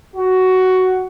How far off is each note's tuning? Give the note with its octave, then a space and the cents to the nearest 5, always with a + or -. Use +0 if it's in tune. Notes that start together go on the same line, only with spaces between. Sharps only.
F#4 +10